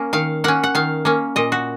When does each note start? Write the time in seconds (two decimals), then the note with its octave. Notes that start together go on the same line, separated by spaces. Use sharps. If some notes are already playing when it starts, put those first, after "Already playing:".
Already playing: A#3 C#4
0.13 D#3 F5
0.44 A#3 C#4 F#5
0.64 F#5
0.75 D#3 F5
1.05 A#3 C#4
1.36 A#2 D#5
1.52 F#4